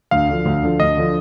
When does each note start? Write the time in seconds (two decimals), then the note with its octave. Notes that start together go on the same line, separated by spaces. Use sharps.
0.11 D2 F5
0.29 D3 F3
0.46 D2
0.63 D3 F3
0.80 D2 D#5
0.97 D3 F3